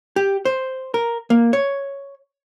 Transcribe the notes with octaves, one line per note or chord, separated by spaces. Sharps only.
G4
C5
A#4
A#3
C#5